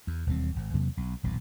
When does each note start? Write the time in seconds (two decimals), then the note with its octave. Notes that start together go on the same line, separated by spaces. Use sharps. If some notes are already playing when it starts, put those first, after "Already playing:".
0.07 E2
0.27 E1 D#2 G3 C4
0.56 G#1
0.73 E2 C3 F#3 A#3
0.97 B1
1.23 D#1 B1 A#2